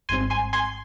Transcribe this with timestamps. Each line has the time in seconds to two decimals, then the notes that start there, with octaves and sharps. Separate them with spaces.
0.09 G#1 G#2 G3 C4 G#5 C6
0.30 G#5 C6
0.53 G#5 C6